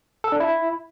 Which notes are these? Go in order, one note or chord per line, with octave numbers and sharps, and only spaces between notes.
A4
D4
E4